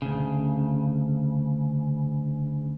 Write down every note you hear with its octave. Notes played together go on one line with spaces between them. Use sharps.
D2 C#3